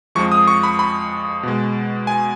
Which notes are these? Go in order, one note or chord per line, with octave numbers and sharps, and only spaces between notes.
F2 F3 G#3 C#6
D#6
C#6
B5
B5
B2 G#3
G#5